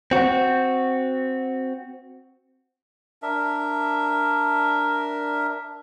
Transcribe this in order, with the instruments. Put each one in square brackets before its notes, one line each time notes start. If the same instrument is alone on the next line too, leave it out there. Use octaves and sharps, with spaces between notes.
[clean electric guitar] C4 F#4
[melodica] D4 A#4 E5